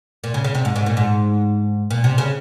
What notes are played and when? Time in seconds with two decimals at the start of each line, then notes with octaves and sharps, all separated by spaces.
0.24 A#2
0.34 C#3
0.44 C#3
0.55 C3
0.65 G#2
0.76 G#2
0.86 A#2
0.97 G#2
1.91 A#2
2.04 C3
2.18 C#3